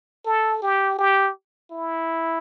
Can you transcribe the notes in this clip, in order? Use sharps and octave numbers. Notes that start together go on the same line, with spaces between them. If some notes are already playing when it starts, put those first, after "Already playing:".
A4
G4
G4
E4